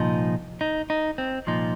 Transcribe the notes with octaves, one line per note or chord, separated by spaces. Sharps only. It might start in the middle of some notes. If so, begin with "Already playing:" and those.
Already playing: C2 A#2 F3 D#4
D#4
D#4
C4
C2 A#2 F3 D#4